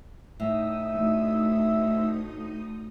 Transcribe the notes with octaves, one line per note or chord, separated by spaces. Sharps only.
A2 D#4 E5 D#6
D2